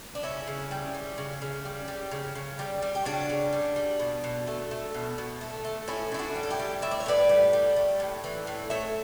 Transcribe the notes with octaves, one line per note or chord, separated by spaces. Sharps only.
D4
C#3 C#4 E4
C#3
G3
G3
C#3
C#3
G3
G3
C#3
C#3
G3
G3
G4
C#3 D4 F#4
C#3
G3
G3
B2
B2
A3
A3
B2
B2
A3
A3
A2 C#4 E4
A2 E4
D4 F#4
G3
A4
E4 G4
G3
A2 E5
D5
C#5
A2 B4 D5
G3
G3
A3
A2
E3
A2
A3 C#5 E5